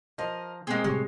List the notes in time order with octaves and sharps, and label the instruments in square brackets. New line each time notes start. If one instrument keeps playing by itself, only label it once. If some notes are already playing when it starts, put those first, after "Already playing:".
[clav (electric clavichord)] F3 [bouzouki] A#4 D#5
[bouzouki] G#3 C4 [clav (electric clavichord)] A#3 G#4
[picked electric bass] A2 C3 G3 [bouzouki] G#3 [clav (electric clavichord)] C#5